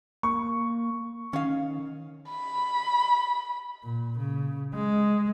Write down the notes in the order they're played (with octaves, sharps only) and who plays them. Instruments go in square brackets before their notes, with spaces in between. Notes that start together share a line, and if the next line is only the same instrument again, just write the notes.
[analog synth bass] A#3 [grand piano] C#6
[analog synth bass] D#3 [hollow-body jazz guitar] C#4 F5
[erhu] B5
[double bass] A#2
C#3
G#3